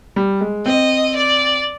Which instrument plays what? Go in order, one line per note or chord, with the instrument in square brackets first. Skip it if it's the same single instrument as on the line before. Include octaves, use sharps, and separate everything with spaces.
[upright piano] G3
G#3
[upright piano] C4 [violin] D#5
[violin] D5